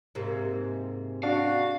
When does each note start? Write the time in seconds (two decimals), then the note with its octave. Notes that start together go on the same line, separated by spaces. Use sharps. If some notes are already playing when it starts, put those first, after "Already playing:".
0.15 G#2 C3 A#3
1.23 D4 F#4 F5